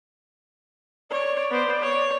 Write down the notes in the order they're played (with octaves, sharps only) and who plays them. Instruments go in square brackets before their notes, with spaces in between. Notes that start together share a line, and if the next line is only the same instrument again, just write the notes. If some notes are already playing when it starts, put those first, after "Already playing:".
[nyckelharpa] C#5 [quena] D5
[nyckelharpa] B3 C5
C#5